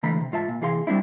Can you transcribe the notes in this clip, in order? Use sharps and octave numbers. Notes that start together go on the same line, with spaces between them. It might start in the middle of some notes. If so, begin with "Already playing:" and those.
C#2 D3 E3 A3 A#5 B5
C3
G#2 F4 E5 A5
A#2
C3 E3 G#4 F5 C6
G3 A3 C4 D4 E4